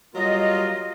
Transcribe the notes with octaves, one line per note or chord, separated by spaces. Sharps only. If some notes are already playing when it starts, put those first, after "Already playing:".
F#3 G3 A#3 F4 D#5